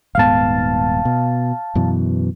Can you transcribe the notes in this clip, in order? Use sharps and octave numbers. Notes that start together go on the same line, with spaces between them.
D#1 G#2 B3 F5 A5
B2
F#2 B2 E3